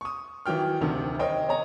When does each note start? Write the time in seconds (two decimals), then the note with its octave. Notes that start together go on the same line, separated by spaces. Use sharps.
0.01 C#6 D#6
0.46 D#3 E3 F#3 G5 F6
0.80 F1 D2 C3 D#3
1.19 A#4 C5 C#5 D#5 G5
1.49 C#5 D#5 G#5 A#5